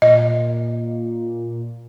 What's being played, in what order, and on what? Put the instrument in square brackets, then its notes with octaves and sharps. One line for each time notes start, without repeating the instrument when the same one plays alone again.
[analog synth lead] A#2 [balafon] D#5